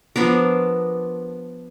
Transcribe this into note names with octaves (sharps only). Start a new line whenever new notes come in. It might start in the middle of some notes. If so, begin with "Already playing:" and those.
F3 B3 D4 A#4